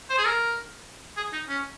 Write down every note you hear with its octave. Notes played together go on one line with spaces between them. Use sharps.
C5
G#4
A#4
G#4
D#4
C#4